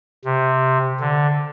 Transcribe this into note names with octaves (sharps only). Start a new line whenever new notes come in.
C3
D3